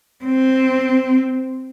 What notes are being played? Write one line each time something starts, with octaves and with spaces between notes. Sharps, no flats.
C4